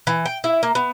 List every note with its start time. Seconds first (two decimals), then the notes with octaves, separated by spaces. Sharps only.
0.07 E3
0.26 G5
0.44 E4
0.63 A#3
0.75 B3